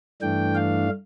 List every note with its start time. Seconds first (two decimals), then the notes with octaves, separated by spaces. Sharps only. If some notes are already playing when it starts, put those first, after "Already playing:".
0.21 G2 E3 A3 D4 G5
0.55 F5